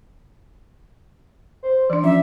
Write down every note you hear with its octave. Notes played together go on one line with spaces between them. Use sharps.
C5
E3 D4 D5
F3 C#4 E5